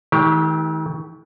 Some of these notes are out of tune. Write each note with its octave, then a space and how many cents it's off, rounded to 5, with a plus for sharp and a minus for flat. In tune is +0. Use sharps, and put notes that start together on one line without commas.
D#3 +40 A3 -35 G4 +0